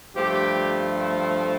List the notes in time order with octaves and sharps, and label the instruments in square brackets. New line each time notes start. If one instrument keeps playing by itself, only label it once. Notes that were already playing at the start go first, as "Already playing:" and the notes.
[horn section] G2 F3 A3 G4